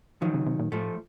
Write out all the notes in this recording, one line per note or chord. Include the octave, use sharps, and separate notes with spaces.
D#3 F3 F#3
C#3
C3
A#2
A2 F3 A3